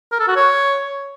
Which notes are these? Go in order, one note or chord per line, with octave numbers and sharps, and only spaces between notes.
A#4
A4
F#4
C#5